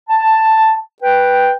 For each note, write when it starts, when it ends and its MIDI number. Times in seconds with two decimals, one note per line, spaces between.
0.10 0.78 81
1.03 1.53 71
1.03 1.53 79